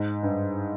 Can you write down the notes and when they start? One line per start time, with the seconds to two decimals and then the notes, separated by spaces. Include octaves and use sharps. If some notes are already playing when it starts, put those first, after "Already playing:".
Already playing: G#2
0.23 G2